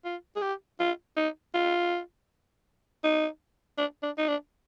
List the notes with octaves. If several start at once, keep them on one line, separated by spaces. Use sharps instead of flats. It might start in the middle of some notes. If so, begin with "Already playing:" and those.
F4
G#4
G4
F4
D#4
F4
D#4
D4
D4
D#4
D4